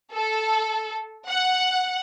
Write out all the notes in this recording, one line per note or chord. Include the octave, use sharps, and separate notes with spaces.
A4
F#5